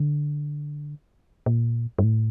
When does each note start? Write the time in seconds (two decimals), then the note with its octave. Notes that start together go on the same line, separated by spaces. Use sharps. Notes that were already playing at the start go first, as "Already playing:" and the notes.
Already playing: D3
1.46 A#2
1.99 G2
2.04 A2